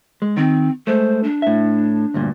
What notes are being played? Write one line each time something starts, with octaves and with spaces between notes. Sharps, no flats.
G#3
D#3 C4
G#3 A3 C5
D4
A2 E5
D2 G2 A#2